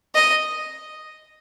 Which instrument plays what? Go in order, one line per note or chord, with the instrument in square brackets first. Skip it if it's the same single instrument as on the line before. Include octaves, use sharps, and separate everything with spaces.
[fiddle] D#5